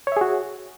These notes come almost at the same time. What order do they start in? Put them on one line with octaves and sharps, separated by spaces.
C#5 E5 G#4 F#4